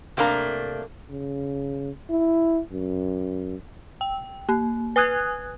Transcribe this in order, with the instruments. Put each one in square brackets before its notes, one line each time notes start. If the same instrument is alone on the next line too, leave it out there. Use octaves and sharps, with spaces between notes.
[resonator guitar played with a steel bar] C3 A3 A#3 D4 A#5
[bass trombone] C#3
E4
F#2
[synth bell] G5
A#3
B4 G#5 D#6 F#6 G#6